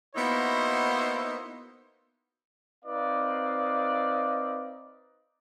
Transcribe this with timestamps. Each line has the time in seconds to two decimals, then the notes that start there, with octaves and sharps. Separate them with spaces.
0.16 A#3 B3 D#4 E4 F#4 C5
2.85 C4 D#4 B4 D5 D#5 F5